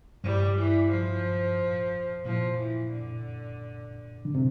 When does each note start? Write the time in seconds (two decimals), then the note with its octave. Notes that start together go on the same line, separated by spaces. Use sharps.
0.23 G2 G3
0.57 E3
0.90 F3
2.25 A#2 F3
2.58 E3
2.91 D3
4.25 D3
4.35 C3